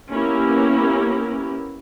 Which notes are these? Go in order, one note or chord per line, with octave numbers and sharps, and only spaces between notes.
A#3 B3 C#4 E4 G4 A#4